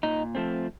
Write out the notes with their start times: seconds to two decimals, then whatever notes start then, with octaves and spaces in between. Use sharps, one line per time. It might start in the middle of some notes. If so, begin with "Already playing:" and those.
0.03 A#2 D#4
0.35 F3 A3 C4